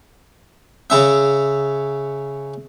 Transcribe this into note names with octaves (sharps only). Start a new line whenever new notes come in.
C#3 C#4 E5